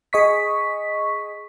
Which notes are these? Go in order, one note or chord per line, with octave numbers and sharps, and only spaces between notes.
G#4 D#5 C#6 B6